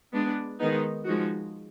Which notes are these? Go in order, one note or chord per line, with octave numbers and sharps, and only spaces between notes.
G#3 B3 D4
D#3 G#3 B3 D#4
F3 G#3 D#4 F#4